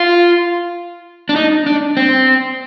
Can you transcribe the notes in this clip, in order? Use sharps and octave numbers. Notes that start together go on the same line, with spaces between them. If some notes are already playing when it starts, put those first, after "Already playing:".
Already playing: F4
D4
D#4
D4
C4